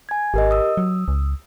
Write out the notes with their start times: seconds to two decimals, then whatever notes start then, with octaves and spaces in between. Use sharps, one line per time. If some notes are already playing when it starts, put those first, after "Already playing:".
0.09 G#5 G#6
0.34 G#1 G4 A#4 D#5
0.51 D#6 E6
0.77 F#3
1.08 C#2